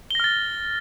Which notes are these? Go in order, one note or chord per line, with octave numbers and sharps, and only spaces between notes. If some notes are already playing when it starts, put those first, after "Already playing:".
F6 A6 A#6 G7